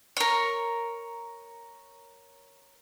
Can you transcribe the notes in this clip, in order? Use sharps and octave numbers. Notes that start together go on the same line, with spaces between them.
A#4 C#5